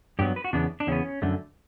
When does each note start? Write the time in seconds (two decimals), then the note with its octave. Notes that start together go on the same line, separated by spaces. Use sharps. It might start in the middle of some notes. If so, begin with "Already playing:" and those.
0.19 G2 F#3 B3 G4
0.36 B4
0.44 F#4
0.53 E2 C#3 B3 D4
0.80 D4
0.87 E2 C#3 B3 C#4
1.22 F#2 D3 A3